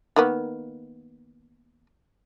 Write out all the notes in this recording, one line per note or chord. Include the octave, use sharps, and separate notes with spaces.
D#3 A#3 B3